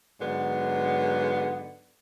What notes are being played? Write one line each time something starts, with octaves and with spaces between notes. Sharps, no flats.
G#2 D3 F#3 B3